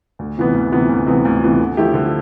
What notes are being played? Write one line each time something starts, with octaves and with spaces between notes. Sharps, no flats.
D2
C3 E3 B3
D2
C3 E3 B3
D2
C3 E3 B3
D2
C3 E3 B3
D3
F3 A3 E4 G4
D3